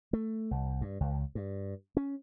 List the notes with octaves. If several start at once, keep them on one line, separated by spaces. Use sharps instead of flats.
A3
C2
G2
C#2
G2
C#4